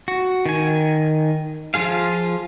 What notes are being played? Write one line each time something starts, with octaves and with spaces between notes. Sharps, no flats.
F#4
D#3 G#5
F3 F4 G#4 F5